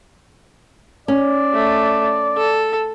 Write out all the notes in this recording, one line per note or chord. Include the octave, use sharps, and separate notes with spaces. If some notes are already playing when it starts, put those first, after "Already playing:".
C#4 D5
A3
A4